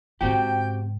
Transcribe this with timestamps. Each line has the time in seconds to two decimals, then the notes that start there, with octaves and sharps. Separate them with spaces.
0.21 G#2 C#3 C4 F#4 G4 G5